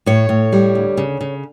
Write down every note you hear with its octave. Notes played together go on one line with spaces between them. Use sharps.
A2 C#5
A2
G3
D2
C#3
C#3